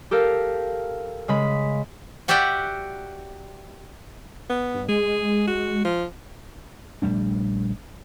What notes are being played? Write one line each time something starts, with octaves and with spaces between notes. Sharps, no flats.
G4 A4 A#4 F5
C#3 G#3 B5 B6
F#4 G4 D5 E5 F#5 G5
B3
G2
G#3 G#4
F#4
F3
A#1 G3 A3 D4